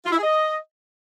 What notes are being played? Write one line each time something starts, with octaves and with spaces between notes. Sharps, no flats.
F4
E4
G#4
D#5